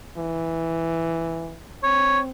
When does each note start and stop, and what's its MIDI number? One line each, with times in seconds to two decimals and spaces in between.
0.16 1.58 52
1.83 2.30 60
1.83 2.19 73